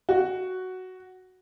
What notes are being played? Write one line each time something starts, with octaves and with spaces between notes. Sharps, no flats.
F#4